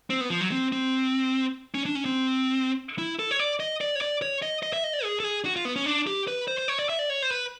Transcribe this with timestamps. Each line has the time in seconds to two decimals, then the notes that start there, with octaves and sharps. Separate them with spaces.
0.10 C4
0.21 B3
0.30 F3
0.41 F#3
0.52 C4
0.72 C4
1.75 C#4
1.86 D4
1.95 C#4
2.05 C4
2.98 E4
3.19 A4
3.31 C#5
3.39 D5
3.60 D#5
3.81 D5
3.95 C#5
4.01 D5
4.22 C#5
4.42 D#5
4.63 D#5
4.73 E5
4.84 D#5
4.93 D5
5.04 G#4
5.20 A4
5.24 G#4
5.45 F#4
5.56 F4
5.65 B3
5.76 C#4
5.86 D4
6.07 G4
6.28 B4
6.48 C5
6.59 C5
6.68 C#5
6.79 D5
6.89 E5
6.99 D5
7.10 C#5
7.22 C5
7.30 B4